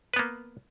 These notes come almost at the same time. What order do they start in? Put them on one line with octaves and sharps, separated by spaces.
B4 B3 A#3